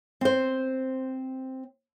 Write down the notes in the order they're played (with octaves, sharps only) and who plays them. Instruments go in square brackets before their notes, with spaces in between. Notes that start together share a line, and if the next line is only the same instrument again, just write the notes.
[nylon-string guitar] C4 C5